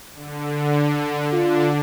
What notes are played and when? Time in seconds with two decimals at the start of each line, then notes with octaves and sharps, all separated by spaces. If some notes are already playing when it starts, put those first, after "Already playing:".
0.15 D3
1.33 D3 D4 F4